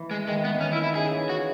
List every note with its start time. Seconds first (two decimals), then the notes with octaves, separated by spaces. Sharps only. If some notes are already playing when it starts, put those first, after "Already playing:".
Already playing: E3
0.11 G#3
0.27 D#3 G#3
0.41 E3 B3
0.54 D#3
0.60 C#4
0.73 E4
0.83 E4
0.95 C#3 G#4
1.11 E3
1.29 F#4